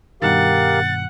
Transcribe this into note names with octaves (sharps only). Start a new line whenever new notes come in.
G2 B2 D#3 G4 A#4 F5 F#5 A6